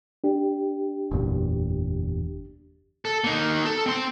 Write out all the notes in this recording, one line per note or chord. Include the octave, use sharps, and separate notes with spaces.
D4 G4
F#1 E2 A#2
A4
A#3 D#4
A4
C4 C6